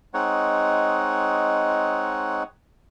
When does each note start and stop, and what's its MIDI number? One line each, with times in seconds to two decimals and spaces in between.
0.14 2.43 56
0.14 2.43 60
0.14 2.43 63
0.14 2.43 73
0.14 2.43 78